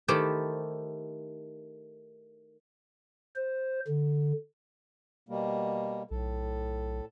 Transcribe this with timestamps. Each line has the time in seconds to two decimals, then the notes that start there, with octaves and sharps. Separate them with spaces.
0.08 D#3 A3 E4 G4 A4 C5
3.36 C5
3.87 D3
5.29 B2 G3 A#3
6.11 B1 A2 A4